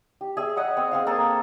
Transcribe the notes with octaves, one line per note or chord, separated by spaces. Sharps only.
G4
G#4 E5
D#5 F#5 B5 C#6
C4
C4 G#4 F5
A#3 A4